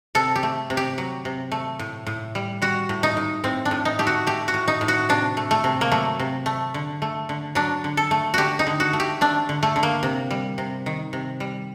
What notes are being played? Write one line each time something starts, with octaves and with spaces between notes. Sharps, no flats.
C3 A4
G4
A3
C3
G4
F#3
C3
A3
A2
A2
G3
G3 F#4
A2
D#4
A2
A2 C4
D4
A2
D#4
A3 G4
F#4
A3 G4
F#4
A2
D#4
A2
F#4
C3 D4
A3
A3
C3
A#3
F#3 A3
C3
A3
D3
A3
D3
F#3 D4
D3
A4
A3
D3 F#4 G4
D#4
D3
F#4
A3
G4
A3 D4
D3
A3
D3
A#3
C3
G3
C3
D#3
C3
G3